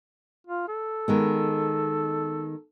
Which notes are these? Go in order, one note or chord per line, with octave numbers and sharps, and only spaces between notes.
F4
A4
D#3 G#3 B3